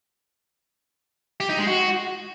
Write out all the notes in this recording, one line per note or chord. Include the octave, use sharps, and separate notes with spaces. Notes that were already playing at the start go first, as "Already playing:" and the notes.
G4
D#4
G#3
F#4